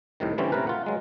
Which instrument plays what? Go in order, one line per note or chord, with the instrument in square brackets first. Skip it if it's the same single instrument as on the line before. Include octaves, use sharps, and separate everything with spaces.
[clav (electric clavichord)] C2 A2 C3 D#3
D3 E3 G3 C4 C#4
A2 C3 E3 A#4 B4
F4 F#5
F#3 G#3